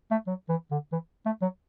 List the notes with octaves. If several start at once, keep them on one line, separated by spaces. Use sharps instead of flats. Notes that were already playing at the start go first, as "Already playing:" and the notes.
A3
F#3
E3
D3
E3
A3
F#3